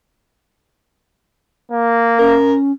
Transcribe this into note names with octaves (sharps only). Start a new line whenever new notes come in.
A#3
C#4 A#4